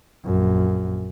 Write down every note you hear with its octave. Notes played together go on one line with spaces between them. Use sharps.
A#1 F#2